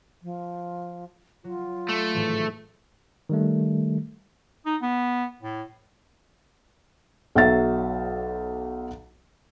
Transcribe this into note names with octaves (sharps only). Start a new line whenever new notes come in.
F3
F#3 F4
A3
G#1 A2 E3
D#3 G3 A3
D#4
B3
A2
B1 F#3 E5 A6